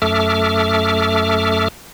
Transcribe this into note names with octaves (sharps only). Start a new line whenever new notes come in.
F#2 A3 A4 E5 D6 F6